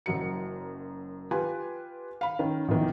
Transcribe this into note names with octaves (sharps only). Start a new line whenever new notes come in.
F#1 F#2 F#3 C#7
F4 G4 B4 G#5
F5 B5
D#3 C#4
A#1 B2 D#3 E3